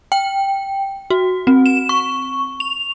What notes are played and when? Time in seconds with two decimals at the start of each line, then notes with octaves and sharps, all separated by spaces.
0.12 G5
1.10 F#4
1.47 C4
1.66 E7
1.89 C#6
2.60 F7